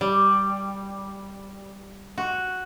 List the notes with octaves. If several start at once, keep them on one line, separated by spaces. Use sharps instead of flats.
G3
F#4